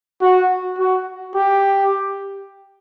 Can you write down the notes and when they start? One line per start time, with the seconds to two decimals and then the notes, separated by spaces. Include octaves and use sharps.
0.22 F#4
0.78 F#4
1.35 G4